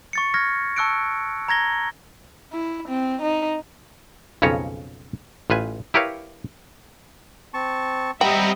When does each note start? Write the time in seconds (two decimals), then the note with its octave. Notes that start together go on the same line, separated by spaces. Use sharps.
0.13 C#6 A6 C#7
0.34 C#6 F6 G#6 A#6
0.76 A5 C#6 E6 F#6 C#7 D7
1.48 A#5 G#6 A#6 G7
2.53 E4
2.88 C4
3.22 D#4
4.42 B1 F2 C#3 C#4 C#5 A#5
5.50 A1 F4 B4 G#5
5.94 E4 G4 A#4 B4 C#5 F5
7.54 C4 A5 C#6
8.21 G3 C4 F#4 D#5 E5 G5 A#5 B5